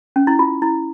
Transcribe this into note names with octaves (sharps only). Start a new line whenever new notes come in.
C#4
E4
F4
E4